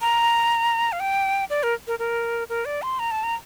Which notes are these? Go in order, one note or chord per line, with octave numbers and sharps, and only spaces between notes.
A#5
F5
G5
D5
A#4
A#4
A#4
A#4
D5
C6
A#5
A5
A#5